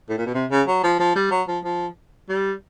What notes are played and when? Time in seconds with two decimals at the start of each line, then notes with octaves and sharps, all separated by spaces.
0.10 A2
0.18 A#2
0.26 B2
0.35 C3
0.51 C#3
0.68 F#3
0.83 F3
1.00 F3
1.16 G3
1.31 F#3
1.48 F3
1.65 F3
2.29 G3